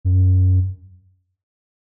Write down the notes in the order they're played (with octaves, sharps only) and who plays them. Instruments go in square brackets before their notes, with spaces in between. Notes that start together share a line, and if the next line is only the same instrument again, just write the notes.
[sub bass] F#2